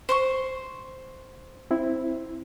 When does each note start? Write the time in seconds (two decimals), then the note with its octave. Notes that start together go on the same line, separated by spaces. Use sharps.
0.09 C5 C6 C#6
1.71 C4 E4